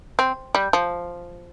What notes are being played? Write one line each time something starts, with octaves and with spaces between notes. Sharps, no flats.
C4
G3
F3